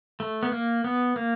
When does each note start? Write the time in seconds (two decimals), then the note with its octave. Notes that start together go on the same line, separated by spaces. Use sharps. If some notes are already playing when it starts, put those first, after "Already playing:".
0.20 A3
0.43 B3
0.52 A#3
0.84 B3
1.16 A#3